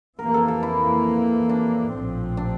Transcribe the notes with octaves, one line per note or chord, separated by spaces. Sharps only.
F2 E3 A#3 A#4
A4
A4
E4
D4
A#1 A2 F3 C4
D4